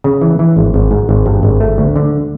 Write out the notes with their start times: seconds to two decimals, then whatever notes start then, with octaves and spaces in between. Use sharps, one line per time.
0.04 C#3
0.21 E3
0.39 E3
0.57 G#1
0.74 G#1
0.91 G#2
1.09 G#1
1.26 G2
1.43 G#1
1.60 A3
1.78 D2
1.96 D3